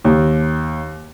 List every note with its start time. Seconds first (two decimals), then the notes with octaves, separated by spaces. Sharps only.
0.04 D#2